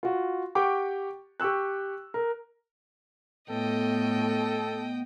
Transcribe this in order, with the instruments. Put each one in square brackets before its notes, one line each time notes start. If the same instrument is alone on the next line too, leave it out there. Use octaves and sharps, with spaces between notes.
[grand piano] F4 F#4
G4 F#5 G5 C#6 D6
G4 G5 C#6 E6 F#6
A#4
[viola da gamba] A2 [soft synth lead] B3 [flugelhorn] A4 [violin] D#5 G5